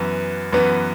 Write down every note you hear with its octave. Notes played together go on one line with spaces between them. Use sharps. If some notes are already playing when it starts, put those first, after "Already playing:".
Already playing: F#2 E3 B3
F#2 E3 B3